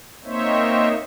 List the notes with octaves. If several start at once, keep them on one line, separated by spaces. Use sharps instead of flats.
A#3 C4 D#4 C5 C#5 E5